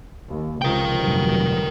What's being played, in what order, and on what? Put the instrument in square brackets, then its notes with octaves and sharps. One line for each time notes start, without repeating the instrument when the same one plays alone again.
[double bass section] D#2
[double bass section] C#2 C3 F3 [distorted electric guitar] A#4 G5
[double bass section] F1 G2 F#3